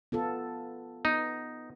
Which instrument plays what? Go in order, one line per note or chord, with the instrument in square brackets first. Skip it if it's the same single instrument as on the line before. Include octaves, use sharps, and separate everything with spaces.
[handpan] B3 F4 A4
[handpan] B3 [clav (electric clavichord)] D#4